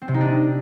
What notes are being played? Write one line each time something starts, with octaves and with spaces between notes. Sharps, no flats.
C4
C3
D#4
D4